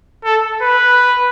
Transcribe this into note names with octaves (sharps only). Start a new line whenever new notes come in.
A4
B4